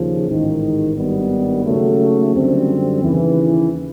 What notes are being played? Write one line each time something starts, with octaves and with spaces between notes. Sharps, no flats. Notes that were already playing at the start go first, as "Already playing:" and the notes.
Already playing: D#2 C#3 F3
A1 G#2 D#3
G#1 G2 D#3 G3 B3
D#2 C#3 F#3 A3
F#2 D3 G3 C4
D#2 C#3 E3